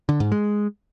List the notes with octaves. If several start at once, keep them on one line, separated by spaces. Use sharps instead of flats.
D3
G#2
G#3